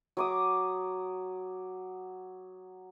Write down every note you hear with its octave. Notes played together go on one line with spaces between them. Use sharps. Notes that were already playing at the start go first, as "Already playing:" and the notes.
F#3 D6 D#6